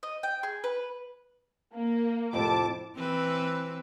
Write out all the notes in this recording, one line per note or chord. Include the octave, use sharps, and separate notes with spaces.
D#5
G5
G#4
B4
A#3
F2 A2 C3 A5 D6
E3 C4 B4